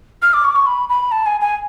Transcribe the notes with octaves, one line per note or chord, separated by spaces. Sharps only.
F6
D6
C#6
D6
C#6
B5
B5
A5
G#5
G#5